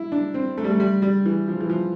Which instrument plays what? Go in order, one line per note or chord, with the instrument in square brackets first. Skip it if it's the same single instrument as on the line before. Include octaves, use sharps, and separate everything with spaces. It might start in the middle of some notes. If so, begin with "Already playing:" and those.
Already playing: [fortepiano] E4
D4
C4
A3
G3
A3
G3
G3
E3
F3
E3
F3